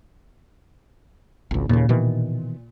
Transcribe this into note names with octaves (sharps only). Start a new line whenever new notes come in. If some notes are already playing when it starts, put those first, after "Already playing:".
G#1 C#2
D#2 A#2 C#3
B2 D#3 E3